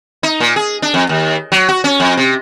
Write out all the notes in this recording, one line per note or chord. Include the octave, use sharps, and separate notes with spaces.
D#4
A#2
G#4
D4
F2
D#2
F#3
F#4
C#4
F2
C3